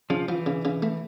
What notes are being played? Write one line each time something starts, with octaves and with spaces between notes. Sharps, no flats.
C#3 F3
E3 F3
C#3
C#3
A3